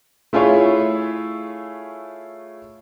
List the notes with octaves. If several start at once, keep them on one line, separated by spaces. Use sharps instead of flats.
A3 E4 F4 G#4 C#5